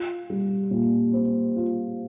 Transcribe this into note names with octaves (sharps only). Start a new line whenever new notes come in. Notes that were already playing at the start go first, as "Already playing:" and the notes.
Already playing: F4
G3
A#2
C4
F4